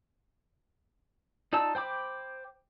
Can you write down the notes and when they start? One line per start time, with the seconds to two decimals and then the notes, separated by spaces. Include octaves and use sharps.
1.53 D#4 F4 D5 A5 E6
1.75 C5 G5 B5 D6